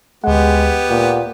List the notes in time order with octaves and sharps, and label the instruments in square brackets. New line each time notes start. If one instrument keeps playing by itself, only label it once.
[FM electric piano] D2 F#5 [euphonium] G#3 [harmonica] B3 G4
[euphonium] A#2 [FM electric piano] F#5